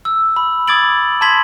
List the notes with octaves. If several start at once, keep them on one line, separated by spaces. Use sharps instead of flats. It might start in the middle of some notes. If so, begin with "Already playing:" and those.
E6
B5
D6 D#6 G#6 A6 D7 F#7
A5 B5 C6 G#6 B6 F#7